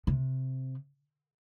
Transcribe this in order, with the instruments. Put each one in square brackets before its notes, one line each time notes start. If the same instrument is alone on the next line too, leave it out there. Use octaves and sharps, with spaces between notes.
[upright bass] C3